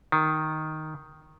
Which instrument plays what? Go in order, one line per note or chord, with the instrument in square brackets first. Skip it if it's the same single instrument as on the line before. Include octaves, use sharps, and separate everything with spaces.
[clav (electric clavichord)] D#3